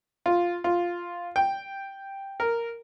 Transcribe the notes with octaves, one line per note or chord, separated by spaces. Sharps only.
F4
F4
G5
A#4